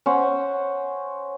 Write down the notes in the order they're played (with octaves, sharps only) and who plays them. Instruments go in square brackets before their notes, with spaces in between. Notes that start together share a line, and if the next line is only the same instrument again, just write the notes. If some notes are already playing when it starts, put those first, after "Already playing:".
[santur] C#4 C5 F#5